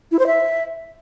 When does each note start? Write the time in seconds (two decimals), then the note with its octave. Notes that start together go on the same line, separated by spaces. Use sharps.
0.11 E4
0.19 C5
0.27 E5